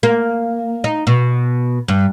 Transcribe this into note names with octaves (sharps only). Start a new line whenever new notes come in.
A#3
D#4
B2
G2